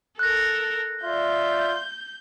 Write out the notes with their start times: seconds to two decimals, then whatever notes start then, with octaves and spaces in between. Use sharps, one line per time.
0.19 A4 A#4 F#6 A#6
1.04 F4 D5 E5 G6